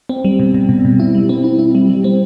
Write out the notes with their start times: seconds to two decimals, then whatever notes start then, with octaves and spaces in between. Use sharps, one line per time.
0.09 C4
0.25 G3
0.40 B2
0.54 B2
0.69 B2
0.85 B2
1.00 E4
1.15 G3
1.29 C4
1.44 E4
1.59 E4
1.75 G3
1.89 G3
2.04 C4